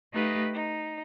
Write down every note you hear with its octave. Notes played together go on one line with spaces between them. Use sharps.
A3 D#4 G4 B4 D#5 F5
D#4